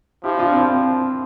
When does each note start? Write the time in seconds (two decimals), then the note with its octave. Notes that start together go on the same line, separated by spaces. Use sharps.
0.24 F3 E4 G4
0.38 D4 F4
0.53 C4 E4
0.68 F3